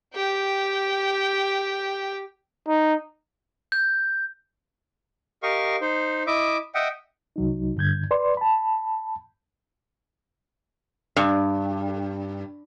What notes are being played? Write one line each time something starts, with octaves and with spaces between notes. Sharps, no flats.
G4 G5
D#4
G6
G4 A#4 D#5 F5 C#6
D#4 C5
E4 D#5 E5 D6
D#5 E5 F#5 G5
C2 F#3 D#4
G2 D3 G6 G#6
B4 D5 C6
A5 B5
G2